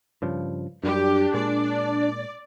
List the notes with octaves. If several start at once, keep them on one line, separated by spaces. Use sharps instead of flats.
G2 C#3 F3
F#2 G3 D4 G4
A#2 G#3 D5